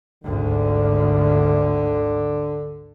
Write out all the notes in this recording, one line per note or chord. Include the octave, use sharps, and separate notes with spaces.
G#1 D2 D3